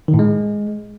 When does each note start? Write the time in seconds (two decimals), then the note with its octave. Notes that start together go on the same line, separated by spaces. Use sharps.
0.08 D#3
0.14 A2
0.19 G#3